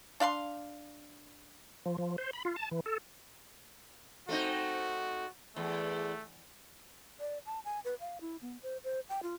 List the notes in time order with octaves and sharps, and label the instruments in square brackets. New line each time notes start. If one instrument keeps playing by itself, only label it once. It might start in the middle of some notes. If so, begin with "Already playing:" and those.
[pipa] D4 F5 B5 C6
[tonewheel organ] F3
F3
C5
B5
F4
A5
E3
A4
[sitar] A3 C4 D#4 [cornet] F#4
[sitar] E2 [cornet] A3
[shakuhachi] D5
A5
G#5
B4
F5
E4
B3
C5
C5
G5
F4